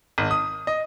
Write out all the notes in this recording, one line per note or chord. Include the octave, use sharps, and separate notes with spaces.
G#1
D#6
D#5